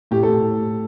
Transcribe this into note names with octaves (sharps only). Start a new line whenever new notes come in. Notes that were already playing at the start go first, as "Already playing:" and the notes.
A2 G4
A4
A2